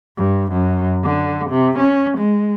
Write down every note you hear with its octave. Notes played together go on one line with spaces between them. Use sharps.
G2
F#2
D3
C3
C#4
G#3